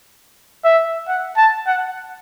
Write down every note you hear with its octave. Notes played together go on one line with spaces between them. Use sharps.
E5
F#5
A5
F#5